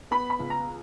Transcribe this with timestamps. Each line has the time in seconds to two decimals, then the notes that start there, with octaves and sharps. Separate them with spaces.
0.11 B3 B5
0.30 B5
0.39 C#2
0.50 A#5